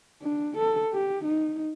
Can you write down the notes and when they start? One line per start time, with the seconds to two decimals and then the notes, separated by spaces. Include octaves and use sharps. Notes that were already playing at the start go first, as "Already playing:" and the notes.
0.22 D4
0.57 A4
0.93 G4
1.25 D#4